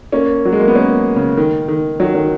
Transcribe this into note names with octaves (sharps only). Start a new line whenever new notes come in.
A#3 C#4
F#3
G#3
A#3
B3
A#3 C#4
C#3
D#3
D#3
D#3 F#3
D#3 F#3